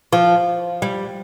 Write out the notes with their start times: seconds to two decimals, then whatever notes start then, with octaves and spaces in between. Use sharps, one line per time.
0.13 F3
0.82 G3